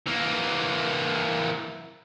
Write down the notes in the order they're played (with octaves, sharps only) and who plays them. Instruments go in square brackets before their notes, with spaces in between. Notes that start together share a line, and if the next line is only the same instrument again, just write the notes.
[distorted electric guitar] E3 A#3